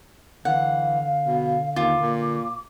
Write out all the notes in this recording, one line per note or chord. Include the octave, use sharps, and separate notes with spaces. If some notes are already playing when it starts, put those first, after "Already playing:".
D3 E3 F5 F#5
B2
D#2 F4 D6
A#2